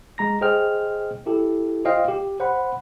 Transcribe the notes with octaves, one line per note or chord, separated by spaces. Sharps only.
G#3 A#5 A#6
G#4 C5 D#5 G5 F6
E4 G4 A4
F4 C5 D#5 F5 G5
G4
C5 F#5 B5